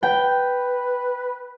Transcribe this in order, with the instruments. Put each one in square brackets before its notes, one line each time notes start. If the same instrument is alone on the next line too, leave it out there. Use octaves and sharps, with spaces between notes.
[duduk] B4 [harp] G5